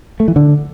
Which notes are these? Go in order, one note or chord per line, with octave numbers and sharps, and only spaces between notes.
A3
E3
D3